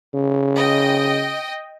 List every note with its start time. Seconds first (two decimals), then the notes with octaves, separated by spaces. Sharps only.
0.14 C#3
0.55 D#5 G5